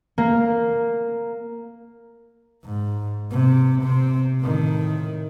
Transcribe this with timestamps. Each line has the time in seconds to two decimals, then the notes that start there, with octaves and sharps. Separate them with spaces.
0.18 A#3
2.64 G#2
3.31 C3
3.82 C3 C4
4.41 A2 D#3